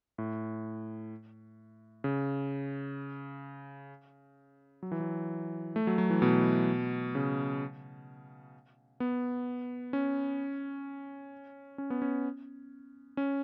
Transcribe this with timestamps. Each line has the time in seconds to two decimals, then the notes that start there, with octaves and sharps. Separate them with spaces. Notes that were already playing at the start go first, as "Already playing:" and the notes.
0.18 A2
2.04 C#3
4.83 F#3
4.92 E3
5.00 F#3
5.76 A3
5.87 F#3
5.98 F#3
6.10 E3
6.22 B2
7.15 C#3
9.00 B3
9.93 C#4
11.78 C#4
11.90 B3
12.02 C#4
13.17 C#4